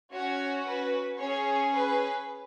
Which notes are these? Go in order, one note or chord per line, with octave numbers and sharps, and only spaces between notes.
C#4 F#4 C#5
B4
C#4 G#4 C#5
B4